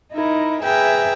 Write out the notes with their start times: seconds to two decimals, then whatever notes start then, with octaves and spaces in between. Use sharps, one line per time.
0.14 D#4 E4 A#4
0.63 G#4 B4 E5 G5 A#5